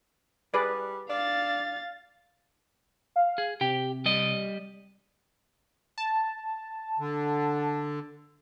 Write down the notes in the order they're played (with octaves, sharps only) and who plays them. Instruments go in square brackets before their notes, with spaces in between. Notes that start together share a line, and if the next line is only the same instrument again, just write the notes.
[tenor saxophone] G3 [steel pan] G#4 B4 D5
[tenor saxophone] D4 [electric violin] F5 A6
[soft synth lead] F5
[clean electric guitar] G#4
[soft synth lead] C3 [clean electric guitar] G4 G5
[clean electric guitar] G3 D5 D#5
[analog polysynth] A5
[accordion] D3